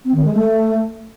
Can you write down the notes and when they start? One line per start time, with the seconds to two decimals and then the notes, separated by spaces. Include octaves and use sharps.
0.05 C4
0.14 D#3
0.24 G#3
0.33 A3